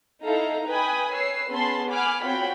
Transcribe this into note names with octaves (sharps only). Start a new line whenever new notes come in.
D#4 E4 A4 F5 A#5
B4 G5 G#5 B5 D#6
B4 C#5 E6 C7
B3 C#4 G#4 A5 B5 C6
F#5 G#5 B5 D6 F6
C4 F4 F#4 C#5 G5 B5